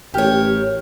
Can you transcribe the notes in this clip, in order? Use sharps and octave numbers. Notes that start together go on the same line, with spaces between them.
A1 G4 A#4 C#5 G5 F6